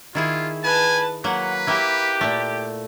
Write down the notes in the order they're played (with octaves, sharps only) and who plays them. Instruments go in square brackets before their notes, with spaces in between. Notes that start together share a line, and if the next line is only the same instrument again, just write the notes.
[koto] D#3 E4 G#4 [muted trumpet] F4
[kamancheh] B4 A5 [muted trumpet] G#5
[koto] F#3 A#3 [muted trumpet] B4 [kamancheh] F#5
[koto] A#3 E4 [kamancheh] G4
[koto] A#2 A3